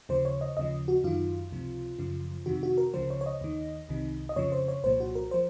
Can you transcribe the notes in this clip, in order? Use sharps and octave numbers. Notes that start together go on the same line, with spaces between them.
D#2 C#3 F3 C5
C#5
D#5
D#2 C#3 F3 D#5
F#4
F#2 D#3 F4
C#2 C3 F3
F#2 C#3 F3
F2 C3 D#3 F#4
F#4
A#4
C#2 C#3 F3 C5
C#5
C#5
D#5
D#2 D#3
C2 C3 D#3
D#5
F2 C#3 F3 C#5
C5
C#5
C2 A#2 F3 C5
F#4
A#4
F3 C5